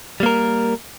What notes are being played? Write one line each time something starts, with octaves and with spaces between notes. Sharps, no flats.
G3 A#3 A#4